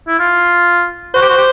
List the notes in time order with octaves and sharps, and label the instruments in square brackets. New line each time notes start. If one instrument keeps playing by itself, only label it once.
[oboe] E4
F4
[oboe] F#4 [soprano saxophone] C5
[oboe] G4
F#4
G4